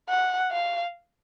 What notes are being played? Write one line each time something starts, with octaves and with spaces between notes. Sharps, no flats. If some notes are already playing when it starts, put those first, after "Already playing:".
F#5
F5